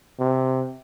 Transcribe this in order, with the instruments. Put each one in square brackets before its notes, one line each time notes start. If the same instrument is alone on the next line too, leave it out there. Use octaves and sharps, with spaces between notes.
[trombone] C3